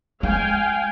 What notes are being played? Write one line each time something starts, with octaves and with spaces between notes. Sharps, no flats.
G#3 F5 G5 G#5